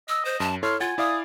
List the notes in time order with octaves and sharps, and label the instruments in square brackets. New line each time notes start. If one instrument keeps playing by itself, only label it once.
[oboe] D#5 [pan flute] E6
[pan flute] C5
[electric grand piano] F#2 [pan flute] A5
[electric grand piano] E4 A4 C#5 [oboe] C6 [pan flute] F6
[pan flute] F4 [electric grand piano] F#5 A6 [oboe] G#5
[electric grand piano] E4 D5 F5 [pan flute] D#6